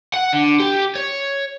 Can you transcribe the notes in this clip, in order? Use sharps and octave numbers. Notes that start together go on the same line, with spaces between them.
F#5
D3
G4
C#5